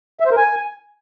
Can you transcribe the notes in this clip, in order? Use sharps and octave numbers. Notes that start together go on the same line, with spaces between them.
E5
C5
A#4
G#5